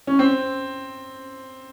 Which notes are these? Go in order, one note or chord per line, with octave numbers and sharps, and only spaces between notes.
C#4
C4